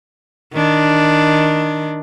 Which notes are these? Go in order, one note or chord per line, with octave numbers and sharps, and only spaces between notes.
D#3 D4